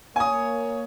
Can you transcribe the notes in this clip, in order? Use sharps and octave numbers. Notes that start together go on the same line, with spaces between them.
A#3 C#5 G#5 D#6